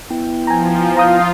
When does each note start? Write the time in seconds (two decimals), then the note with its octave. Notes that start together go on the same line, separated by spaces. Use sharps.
0.10 B3 E4 G5
0.47 F3 G#5 A#5
0.97 F4 F5 A#5 D#6 G6